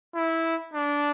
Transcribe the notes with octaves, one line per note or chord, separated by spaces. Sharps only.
E4
D4